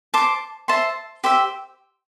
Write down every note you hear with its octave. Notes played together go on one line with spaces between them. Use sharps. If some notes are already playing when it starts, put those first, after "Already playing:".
C5 A5 D6
C5 E5 A5 C6
G4 C5 E5